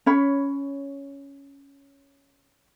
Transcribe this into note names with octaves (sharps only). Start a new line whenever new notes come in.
C#4 C#5 B5